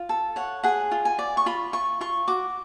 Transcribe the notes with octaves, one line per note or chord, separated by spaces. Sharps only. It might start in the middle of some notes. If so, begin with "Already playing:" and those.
Already playing: F4
A4
C#5 F#5
G#4 F#5
F4
G#5
D5
C#6
F4 B5
F4 C#6
F4 C#6
F#4 D6